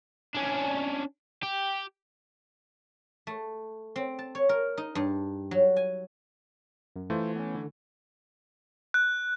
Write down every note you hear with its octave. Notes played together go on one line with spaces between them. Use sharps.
C#4 D4
G4
A3
C4
A5
C#5
A#4
D#4
G2
F#3
G#5
F#2
E3 A3 F4 C5
B3 C#4
D3
F#6